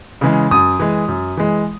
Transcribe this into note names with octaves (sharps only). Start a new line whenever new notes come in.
C#3 E3 G#3
F#2 D#6
E3 G#3
F#2
E3 G#3